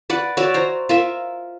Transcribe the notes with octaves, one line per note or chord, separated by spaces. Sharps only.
B4 D5 F#5
F#4 C#5 D5 E5
C5 A#5
F4 A#4 E5